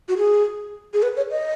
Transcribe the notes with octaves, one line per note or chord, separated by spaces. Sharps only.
F#4
G#4
G#4
B4
C#5
D#5